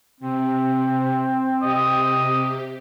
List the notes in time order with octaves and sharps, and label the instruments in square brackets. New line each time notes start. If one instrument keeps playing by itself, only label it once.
[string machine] C3 [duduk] C4
[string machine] C3 G4 [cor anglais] D#5